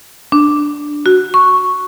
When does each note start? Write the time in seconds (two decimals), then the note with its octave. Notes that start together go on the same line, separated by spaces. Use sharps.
0.32 D4
1.06 F#4
1.34 C#6